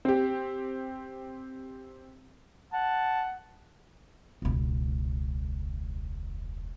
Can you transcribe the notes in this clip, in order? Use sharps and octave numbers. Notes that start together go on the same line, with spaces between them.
C4 G4
F#5 A5
E1 C#2